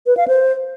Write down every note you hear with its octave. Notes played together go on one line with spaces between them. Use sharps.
B4
F5
C5